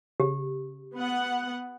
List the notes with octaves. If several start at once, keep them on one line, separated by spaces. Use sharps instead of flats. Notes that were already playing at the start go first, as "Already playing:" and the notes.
C#3 G4
B3 F#5